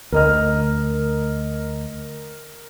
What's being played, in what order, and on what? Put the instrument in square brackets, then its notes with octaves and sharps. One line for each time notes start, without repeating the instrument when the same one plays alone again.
[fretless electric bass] D2 [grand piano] A#4 D#5 F6